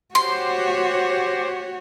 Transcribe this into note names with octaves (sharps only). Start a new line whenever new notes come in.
F#4 G4 C5 C#5 C6